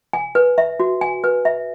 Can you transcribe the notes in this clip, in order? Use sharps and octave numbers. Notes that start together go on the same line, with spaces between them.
G#5
B4
E5
F#4
G#5
B4
E5